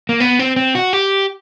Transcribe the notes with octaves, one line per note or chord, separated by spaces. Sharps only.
A#3
B3
C4
C4
F#4
G4